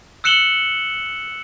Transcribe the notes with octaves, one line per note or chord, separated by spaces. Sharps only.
E6 F#6 C#7 E7 F#7 G7